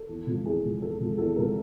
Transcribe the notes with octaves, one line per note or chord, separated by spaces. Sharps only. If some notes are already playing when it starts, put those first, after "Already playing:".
Already playing: A4
E2
C3 F3 G#3
E2 G#4
C3 F3 G#3
E2 A4
C3 F3 G#3
E2 A4
C3 F3 G#3 A#4